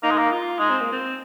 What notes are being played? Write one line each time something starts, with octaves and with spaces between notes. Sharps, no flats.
A#3 D#4
G#3
A#3
F4
G#3 D#4
C4
A#3
C4